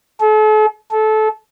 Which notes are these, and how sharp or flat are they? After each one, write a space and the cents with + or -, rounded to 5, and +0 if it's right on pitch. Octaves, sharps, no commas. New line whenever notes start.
A4 -40
A4 -20